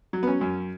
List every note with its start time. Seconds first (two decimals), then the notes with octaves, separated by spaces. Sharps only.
0.13 F#3
0.23 B3
0.27 C#4
0.41 F#2